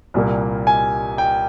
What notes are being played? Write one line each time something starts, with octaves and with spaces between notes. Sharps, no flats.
C2 A#2 G3 A#3
G#5
G5